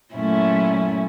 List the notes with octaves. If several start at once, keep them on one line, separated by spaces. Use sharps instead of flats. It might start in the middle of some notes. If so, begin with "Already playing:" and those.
A#2 F#3 A3 C#4 E4